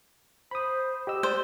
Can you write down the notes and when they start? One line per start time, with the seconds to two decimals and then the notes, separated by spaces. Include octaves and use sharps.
0.51 C5 B5 D#6
1.07 G4 D#5 E6
1.23 C5 D5